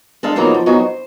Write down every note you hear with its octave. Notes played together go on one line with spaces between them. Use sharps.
G#3 D4 A4 F5
C#3 F3 F#3 A#3 B3 D#4
F3
F#3 B3 C4 D#4 F#4 G#4
C5